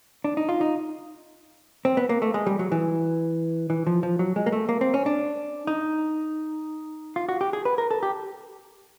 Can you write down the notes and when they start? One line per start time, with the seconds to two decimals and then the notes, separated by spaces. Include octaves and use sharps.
0.24 D4
0.37 D#4
0.49 F4
0.61 D#4
1.85 C4
1.97 B3
2.09 A#3
2.22 A3
2.34 G#3
2.47 G3
2.59 F#3
2.72 E3
3.70 E3
3.87 F3
4.03 F3
4.19 F#3
4.36 G#3
4.46 A#3
4.52 A3
4.69 A#3
4.81 C4
4.94 C#4
5.06 D4
5.67 D#4
7.16 F4
7.29 F#4
7.41 G4
7.53 G#4
7.65 B4
7.78 A#4
7.91 A4
8.03 G4